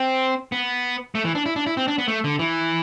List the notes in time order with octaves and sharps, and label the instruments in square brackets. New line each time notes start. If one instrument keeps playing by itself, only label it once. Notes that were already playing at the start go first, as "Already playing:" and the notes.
Already playing: [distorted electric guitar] C4
B3
A3
E3
D4
E4
D4
E4
C4
D4
B3
A3
D3
E3